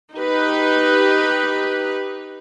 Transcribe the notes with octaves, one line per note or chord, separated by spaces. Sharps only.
D#4 G4 B4